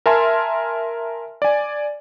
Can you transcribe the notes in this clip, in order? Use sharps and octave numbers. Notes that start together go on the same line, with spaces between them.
A#4 E5 G#5 A5 C6 F6
D5 G#5